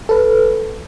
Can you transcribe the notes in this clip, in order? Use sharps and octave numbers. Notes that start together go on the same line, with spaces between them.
A4 B4